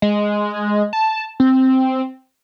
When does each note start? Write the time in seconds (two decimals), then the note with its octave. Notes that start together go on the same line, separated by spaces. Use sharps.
0.02 G#3
0.93 A5
1.40 C4